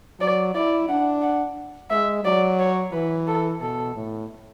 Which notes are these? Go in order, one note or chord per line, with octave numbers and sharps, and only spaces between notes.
F#3 D5
E4 D5
D4 F#5
F#5
G#3 E5
F#3 D5
C#5
E3 B4
A4
B2 A4
A2